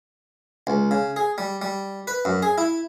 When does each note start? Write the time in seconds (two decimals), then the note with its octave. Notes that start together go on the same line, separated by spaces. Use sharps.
0.67 C#2
0.91 C#3
1.16 G#4
1.38 G3
1.62 G3
2.07 B4
2.25 F#2
2.42 G#4
2.58 E4